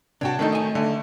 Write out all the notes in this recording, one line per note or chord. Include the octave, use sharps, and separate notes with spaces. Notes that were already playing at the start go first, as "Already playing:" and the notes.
C3 D4 F#4 C#5 G5 A5
D#3 A3 D4 D#4
D#5 G#5
D3 A3